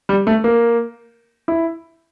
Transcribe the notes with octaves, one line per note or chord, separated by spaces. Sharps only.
G3
A3
A#3
E4